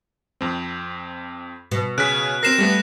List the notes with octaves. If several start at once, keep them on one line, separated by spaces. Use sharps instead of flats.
F2 C4
B2
C#3 G#4 F#6 B6 D7
C4 A#4 A#6 C7 E7
G3 A3 B3